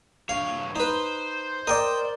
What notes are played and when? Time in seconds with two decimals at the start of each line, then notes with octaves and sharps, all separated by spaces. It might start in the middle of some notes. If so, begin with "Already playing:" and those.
0.29 G2 C#5 F5
0.76 D#4 B4 C5
1.67 A#4 D5 D#5 G5